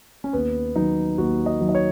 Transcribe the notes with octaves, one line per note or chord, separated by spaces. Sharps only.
C#4
D#2 B3
D#3 F#3 D#4
D#2 F#4
D#5
D#3 F#3
D#5
C#5